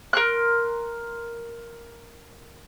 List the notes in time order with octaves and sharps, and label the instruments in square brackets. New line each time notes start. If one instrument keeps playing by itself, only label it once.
[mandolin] A#4 C6 F#6